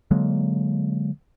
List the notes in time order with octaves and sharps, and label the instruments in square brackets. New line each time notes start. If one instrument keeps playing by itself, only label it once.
[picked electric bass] D3 F#3 G#3 A#3